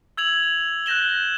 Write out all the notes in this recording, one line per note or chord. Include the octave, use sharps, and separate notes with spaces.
E6 G#6 F7 F#7
F#6 G6 A#6 E7 G7